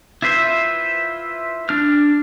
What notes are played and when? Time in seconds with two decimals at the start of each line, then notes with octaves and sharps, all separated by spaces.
0.22 E4 F4 B4 C5 E5
1.69 D4 F6